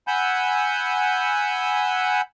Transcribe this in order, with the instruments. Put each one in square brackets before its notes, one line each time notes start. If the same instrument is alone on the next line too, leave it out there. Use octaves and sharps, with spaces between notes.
[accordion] F#5 G#5 B5 E6 G6